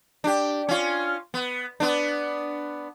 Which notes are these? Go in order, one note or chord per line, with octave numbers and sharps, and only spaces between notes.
D4 G4
C#4 F4
B3
B3 D4